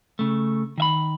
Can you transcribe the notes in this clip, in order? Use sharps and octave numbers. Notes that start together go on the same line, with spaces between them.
C#3 A3
D#3 E5 B5